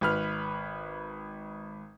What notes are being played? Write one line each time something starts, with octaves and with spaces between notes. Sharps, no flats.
G#1 B4 F6